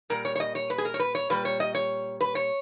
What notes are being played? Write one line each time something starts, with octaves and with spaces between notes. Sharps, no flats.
A#2 G3 A#4
C#5
C#5
D#5
C#5
B4
G#4
A#4
C#5
B4
C#5
A#2 G3 B4
C#5
D#5
C#5
B4
C#5